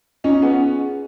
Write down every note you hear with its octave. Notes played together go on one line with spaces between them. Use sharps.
C#4 D#4 F4
B3 C#4 G#4